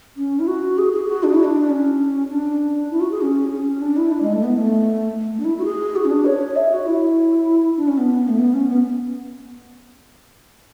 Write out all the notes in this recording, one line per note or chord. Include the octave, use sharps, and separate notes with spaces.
C#4
E4
F#4
G#4
G#4
F#4
D4
E4
D4
C#4
D4
E4
F#4
G#4
C#4
C#4
D4
E4
D4
G#3
A3
B3
A3
A3
D4
E4
F#4
G#4
F#4
C#4
D4
C#5
E5
F#4
E4
D4
C#4
B3
A3
B3
C#4
B3